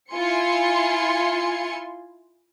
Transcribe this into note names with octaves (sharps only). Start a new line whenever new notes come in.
E4 F4 G#5 C6 C#7